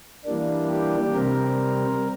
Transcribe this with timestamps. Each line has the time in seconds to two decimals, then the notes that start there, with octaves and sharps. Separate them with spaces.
0.25 E3 G3 A#3 D4
0.70 G4
1.14 C3 G3 C4 A#4